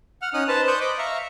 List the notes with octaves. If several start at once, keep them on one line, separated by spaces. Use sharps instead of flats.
F#5 F6
C#4 D#4 D#6 F6 F#6
B4 C5 A5
C5 D5 C#6 D#6 F#6 G6
D#5 B5 D6
E5 F5 A#5 C#6